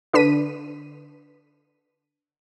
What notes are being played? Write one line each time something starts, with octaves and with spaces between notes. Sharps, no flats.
D3 D4 B4 B6 D#7